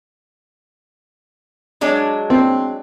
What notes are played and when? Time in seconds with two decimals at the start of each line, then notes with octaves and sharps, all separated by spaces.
1.81 F#3 G#3 D4
2.30 C4